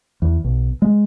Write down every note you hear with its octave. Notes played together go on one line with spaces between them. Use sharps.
E2
B1
G#3